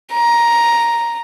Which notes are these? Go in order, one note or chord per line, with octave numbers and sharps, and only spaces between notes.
A#5